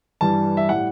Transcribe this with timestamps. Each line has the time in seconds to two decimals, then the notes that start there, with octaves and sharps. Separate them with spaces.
0.21 G2 E3 G3 A5
0.57 E5
0.69 A2 G3 F#5